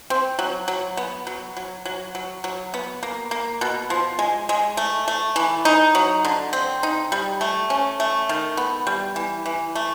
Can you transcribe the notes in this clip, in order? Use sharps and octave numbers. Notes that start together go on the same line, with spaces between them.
C4
F#3
F#3
B3
F#3
F#3
F#3
F#3
F#3
B3
A#3
A#3
B2
F3
G#3
G#3
A3
A3
E3
D#4
F#3
D3
C4
D#4
G3
A3
C#4
A3
D#3
B3
G3
E3
E3
A3